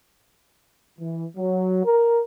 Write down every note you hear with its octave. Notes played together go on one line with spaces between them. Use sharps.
E3
F#3
A#4